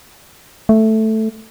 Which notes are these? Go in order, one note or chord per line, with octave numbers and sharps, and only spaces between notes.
A3